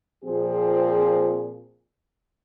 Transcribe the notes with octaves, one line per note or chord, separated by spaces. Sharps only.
A#2 F3 C4 G#4